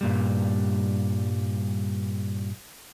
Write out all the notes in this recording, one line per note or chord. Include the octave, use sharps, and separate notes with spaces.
G2 A#2 G3